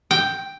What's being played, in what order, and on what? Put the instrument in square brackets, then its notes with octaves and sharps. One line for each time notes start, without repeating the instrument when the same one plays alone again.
[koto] G5